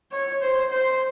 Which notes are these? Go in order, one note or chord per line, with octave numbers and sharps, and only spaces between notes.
C#5
C5
C5